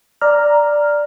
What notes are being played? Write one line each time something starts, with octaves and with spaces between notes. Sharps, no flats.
D5 A#5 F6